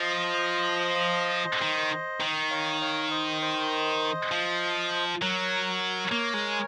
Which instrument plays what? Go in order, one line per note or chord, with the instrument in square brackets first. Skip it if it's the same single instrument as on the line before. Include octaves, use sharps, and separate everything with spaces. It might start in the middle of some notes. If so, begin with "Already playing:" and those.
Already playing: [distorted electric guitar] F3 [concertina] C5 D#5
[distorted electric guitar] D#3
D#3
[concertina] C#5 F5
C#5 F5
C5 D#5
C5 D#5
[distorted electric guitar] F3
[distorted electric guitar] F#3 [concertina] A#4 C#5
[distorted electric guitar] A#3
G#3